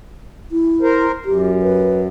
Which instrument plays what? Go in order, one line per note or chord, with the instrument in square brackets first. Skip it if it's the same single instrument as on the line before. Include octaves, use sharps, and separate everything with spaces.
[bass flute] E4
[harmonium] A#4 C5
[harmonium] F#2 [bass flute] G4
[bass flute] B4